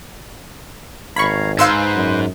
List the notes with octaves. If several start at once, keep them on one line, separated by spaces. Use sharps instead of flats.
G#1 C#5 F5 A#5 B5 C#6
G#2 B4 C5 F5 C6 E6
F#2